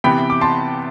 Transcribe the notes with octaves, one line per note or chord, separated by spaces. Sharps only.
C3 E3 B3 G5 B5
D6
A5 C6